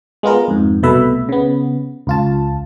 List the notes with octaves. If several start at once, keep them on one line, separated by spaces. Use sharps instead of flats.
G#3 B3 F4 A#4
F2 G#2
C2 B2 A3 B4 E5
C#3 B3
C#2 F4 A5